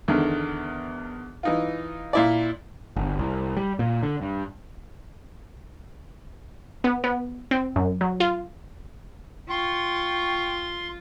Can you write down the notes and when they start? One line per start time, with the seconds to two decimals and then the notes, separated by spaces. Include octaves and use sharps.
0.08 E2 D3 D#3
1.43 E3 D#4 F4
2.13 A#2 E4 D5
2.96 G1
3.19 C2
3.57 G3
3.79 A#2
4.03 D3
4.22 G2
6.84 B3
7.04 B3
7.51 C4
7.76 F#2
8.01 F#3
8.20 F4
9.50 F4 G5 C6 C#6